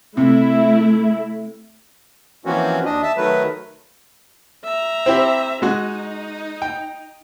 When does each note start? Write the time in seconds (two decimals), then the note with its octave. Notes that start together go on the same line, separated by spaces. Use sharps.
0.17 C3 A3 E4
2.45 E3 F3 A#3 C4 C#4 F#4
2.85 D#2 D4 D#5
3.03 E5 A5
3.16 D#3 F#3 A3 B4
4.64 E5 A#5
5.06 C4 E4 G4
5.62 G#3 D#4 F#4
6.62 G5